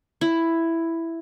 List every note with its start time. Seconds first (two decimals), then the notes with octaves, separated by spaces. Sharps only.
0.21 E4